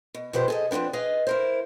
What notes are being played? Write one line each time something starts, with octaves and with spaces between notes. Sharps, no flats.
B2
B2 F3 G4 B4 C5
G#4 A4 D#5
F3 B3 C4 D4 B4
G#4 B4 D#5 F5
E4 A#4 C5